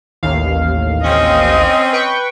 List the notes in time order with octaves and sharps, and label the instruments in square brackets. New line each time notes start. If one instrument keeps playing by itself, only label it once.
[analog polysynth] A1 D#2 F5
[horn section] C4 C#4 [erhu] D#5
[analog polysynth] B4 G5 C#6